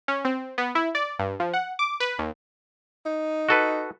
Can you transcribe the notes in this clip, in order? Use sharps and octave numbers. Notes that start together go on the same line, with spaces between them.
C#4
C4
B3
E4
D5
G2
F3
F#5
D6
B4
D#2
D#4
F#4 A4 B4